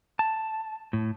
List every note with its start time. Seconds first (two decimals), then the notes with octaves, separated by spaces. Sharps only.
0.19 A5
0.93 A2